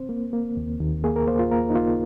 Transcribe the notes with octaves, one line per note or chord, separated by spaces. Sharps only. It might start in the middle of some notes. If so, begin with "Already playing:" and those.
Already playing: C4 C5
A#3
A#3
D#2
D#2
A#3 G#4
A#4
A#3 C5
F4
A#3 A#4
D#4
A#3 F4